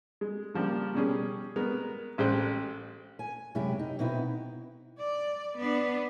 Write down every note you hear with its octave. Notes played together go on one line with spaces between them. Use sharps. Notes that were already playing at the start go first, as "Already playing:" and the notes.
G#3
C#3 F3 G3 A#3
B2 G3 C#4 G#4
G#3 B3 A#4
A1 G#3 C5 G5 F#6
G#5
F#2 C3 G#3 E4 G4
D#4
B2 B3 C4 D#4 E4
D5
B3 D4